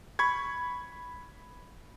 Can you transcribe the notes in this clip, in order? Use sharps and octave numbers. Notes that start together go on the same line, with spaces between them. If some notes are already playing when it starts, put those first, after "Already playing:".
B5 C#6 G#6